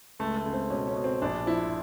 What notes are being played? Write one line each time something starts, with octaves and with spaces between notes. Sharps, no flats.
C#2 A3
A3
C#2
C4
B2 C#4
C#4
B2
C4
A#1 D4
F3 E4